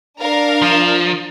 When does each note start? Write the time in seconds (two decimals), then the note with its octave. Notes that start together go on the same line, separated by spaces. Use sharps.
0.19 D4 A#4 F5
0.62 F3